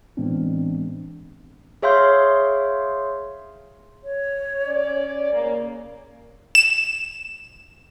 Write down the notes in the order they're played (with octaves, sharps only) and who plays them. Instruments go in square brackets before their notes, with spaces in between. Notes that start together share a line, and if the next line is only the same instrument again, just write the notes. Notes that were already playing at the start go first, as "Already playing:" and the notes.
[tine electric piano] A2 E3 G#3 B3 C4 D4
[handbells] G#4 C#5 E5 F5 C6 G6
[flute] C#5
[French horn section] C#4 D5
C#3 A#3
[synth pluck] E7